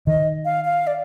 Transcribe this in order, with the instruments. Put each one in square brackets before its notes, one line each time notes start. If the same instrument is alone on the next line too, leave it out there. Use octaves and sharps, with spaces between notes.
[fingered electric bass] D#3 [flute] D#5
[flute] F5
F5
D5